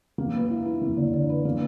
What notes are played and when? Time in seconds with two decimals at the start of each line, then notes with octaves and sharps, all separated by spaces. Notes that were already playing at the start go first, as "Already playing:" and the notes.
0.18 A#3
0.34 B4
0.50 E4
0.66 E4
0.81 A#3
0.97 D3
1.13 D3
1.29 B4
1.45 A#3